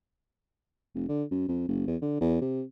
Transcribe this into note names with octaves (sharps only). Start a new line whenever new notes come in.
F1
D3
F#2
F2
F#1
E2
D3
E2
C3